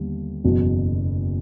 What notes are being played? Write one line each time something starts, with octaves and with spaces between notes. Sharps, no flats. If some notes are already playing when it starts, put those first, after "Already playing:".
Already playing: D#2 D3 G3 B3
F#1 E2 B2 F#3